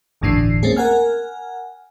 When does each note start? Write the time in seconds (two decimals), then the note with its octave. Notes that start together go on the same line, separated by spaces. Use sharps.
0.21 G1 D2 A2 E3 D4 C7
0.63 A3 A#3 C4 C#4 G#4
0.76 A#4 F#5 G#5 F6